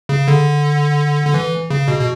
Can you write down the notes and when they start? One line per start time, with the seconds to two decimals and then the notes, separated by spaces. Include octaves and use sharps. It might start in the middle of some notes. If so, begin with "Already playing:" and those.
0.09 C#3
0.28 D3
1.26 D3
1.34 E3
1.70 C#3
1.88 B2
1.99 B2